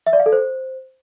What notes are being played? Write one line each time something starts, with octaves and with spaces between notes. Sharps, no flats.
E5
D5
F5
A4
C5